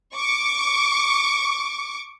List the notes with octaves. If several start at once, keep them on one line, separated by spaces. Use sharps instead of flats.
C#6 D6